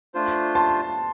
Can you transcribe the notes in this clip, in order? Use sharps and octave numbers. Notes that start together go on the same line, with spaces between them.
A3 D4 F4 C5
A5 C6